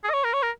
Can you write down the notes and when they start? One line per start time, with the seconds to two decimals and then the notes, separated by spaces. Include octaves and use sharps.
0.04 G#4
0.10 D#5
0.14 C#5
0.24 A#4
0.33 C#5
0.42 A#4